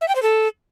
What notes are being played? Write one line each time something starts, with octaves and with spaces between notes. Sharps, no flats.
E5
G5
C5
A4